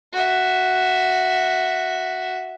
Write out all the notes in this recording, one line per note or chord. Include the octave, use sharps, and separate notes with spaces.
F#4 E5